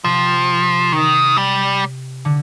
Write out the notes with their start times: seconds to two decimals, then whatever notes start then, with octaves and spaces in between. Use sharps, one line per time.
0.04 C3 F3
0.92 D#3
1.37 G3
2.25 D3